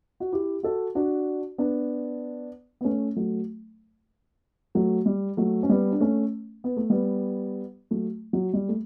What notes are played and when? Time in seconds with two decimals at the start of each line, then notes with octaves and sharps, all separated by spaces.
0.20 F#4
0.32 E4 G4
0.63 F#4 A4
0.95 D4 F#4
1.58 B3 D4
2.81 B3
2.85 A3 C#4
3.16 F#3 A3
4.75 F#3 A3
5.06 G3
5.37 F#3 A3
5.63 C#4
5.69 G3 B3
5.92 D4
6.00 A3 C#4
6.64 B3
6.77 A3
6.90 G3 B3
7.91 F#3 A3
8.33 F#3
8.53 G3
8.69 A3